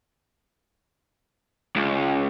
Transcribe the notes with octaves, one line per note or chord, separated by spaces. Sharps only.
C#2